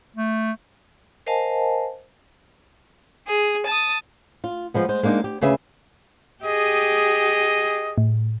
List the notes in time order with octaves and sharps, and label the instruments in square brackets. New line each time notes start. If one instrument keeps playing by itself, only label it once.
[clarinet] A3
[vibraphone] A#4 C5 D#5 F5 G#5 A5
[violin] G#4
A5 D#6
[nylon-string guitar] F4
F3 G#3 B3
G#3 C5
G#3 A#3 D4 D#4
G4
D2 C#3 G#4 B4 E5
[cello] G4 G#4 [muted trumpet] D#5
[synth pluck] A2